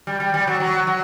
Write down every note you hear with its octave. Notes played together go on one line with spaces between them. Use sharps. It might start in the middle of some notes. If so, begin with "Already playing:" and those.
G3
G3
G3
F#3
F#3
F#3